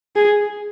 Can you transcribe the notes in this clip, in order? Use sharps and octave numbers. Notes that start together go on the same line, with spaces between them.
G#4